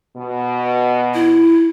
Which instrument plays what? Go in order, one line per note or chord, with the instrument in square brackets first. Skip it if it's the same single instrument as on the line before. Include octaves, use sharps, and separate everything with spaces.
[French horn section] B2
[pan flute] E4